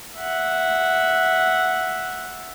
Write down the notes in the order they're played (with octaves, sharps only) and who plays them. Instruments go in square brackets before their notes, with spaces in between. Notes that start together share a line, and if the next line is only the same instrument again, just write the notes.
[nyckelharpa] E5 F#5